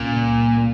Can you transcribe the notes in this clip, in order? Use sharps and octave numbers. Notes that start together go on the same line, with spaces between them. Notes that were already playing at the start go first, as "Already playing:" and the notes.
Already playing: C#2 A#2 C#3 G3 C#4